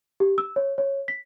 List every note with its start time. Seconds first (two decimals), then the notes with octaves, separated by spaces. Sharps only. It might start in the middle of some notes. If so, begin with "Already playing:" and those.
0.20 G4
0.38 E6
0.56 C#5
0.78 C#5
1.08 B6